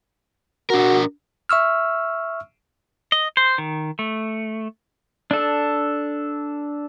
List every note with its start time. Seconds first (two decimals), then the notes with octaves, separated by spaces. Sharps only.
0.70 D4 F#4 A#4
1.49 E5 C#6 E6 F6
3.12 D#5
3.37 C5
3.58 D#3
3.99 A3
5.31 D4 A4